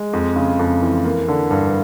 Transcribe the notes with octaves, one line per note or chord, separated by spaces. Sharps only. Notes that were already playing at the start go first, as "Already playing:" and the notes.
Already playing: G#3
F2
C#3
F2
E3
A#3
D3
G2